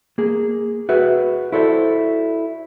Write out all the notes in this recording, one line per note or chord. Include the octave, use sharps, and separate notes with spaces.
A#3 G#4
F#4 G#4 B4 E5
E4 F#4 A4 C5 D5 E5